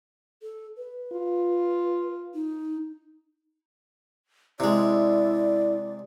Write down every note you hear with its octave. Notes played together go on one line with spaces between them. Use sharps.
A4
B4
F4
D#4
C3 G#3 E4 D5